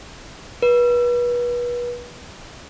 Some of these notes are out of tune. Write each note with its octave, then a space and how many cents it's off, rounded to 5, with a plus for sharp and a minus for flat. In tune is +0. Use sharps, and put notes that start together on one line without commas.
B4 -30